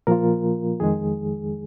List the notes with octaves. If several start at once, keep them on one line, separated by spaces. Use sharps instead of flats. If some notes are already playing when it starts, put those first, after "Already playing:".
A#2 F3 A#3 F4 A#4
F2 D#3 G#3 G#4